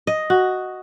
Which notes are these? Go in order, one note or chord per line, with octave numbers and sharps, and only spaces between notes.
D#5
F#4